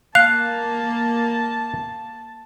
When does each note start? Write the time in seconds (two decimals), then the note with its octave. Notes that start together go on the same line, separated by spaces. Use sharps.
0.15 A#3 F5 A5 F#6